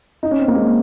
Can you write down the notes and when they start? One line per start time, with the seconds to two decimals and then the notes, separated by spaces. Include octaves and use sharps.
0.23 D#4
0.31 C#4
0.39 C4
0.48 A#3
0.56 G#3